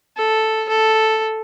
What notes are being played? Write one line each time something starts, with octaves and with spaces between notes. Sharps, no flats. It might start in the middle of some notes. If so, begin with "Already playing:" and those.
A4
A4